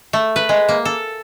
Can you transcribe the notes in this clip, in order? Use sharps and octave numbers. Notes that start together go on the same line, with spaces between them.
A3
B4
G#3
A#3
A4